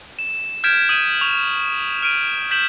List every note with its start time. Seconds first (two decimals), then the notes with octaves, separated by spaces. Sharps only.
0.19 E7
0.64 F6 G6 G#6 B6 D7 E7
0.89 D#6 D#7
1.21 C#6 F7
2.02 F6 D7 D#7
2.51 G6 B6 E7 F#7